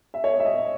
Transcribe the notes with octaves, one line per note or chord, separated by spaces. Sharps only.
E5
C#5
D#5
E5
D#5